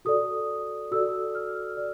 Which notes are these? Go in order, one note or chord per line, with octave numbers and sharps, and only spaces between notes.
F#4 A4 D5 D#6
F#4 A4 D5 E6
F6
D5